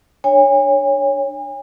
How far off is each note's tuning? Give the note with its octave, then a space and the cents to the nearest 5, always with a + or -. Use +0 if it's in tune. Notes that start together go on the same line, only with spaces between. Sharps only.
D4 +20 C#5 +0 G#5 -40